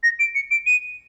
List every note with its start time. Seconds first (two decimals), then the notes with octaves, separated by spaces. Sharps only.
0.03 A#6
0.19 D7
0.35 C#7
0.51 D7
0.66 D#7